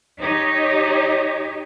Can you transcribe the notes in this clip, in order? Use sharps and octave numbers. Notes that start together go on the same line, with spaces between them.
D#4 G4 C#5 D#5